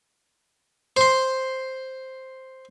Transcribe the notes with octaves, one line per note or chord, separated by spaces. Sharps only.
C5 C6